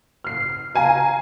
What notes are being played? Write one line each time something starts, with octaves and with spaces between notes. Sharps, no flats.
F6 C7
F5 G#5 A#5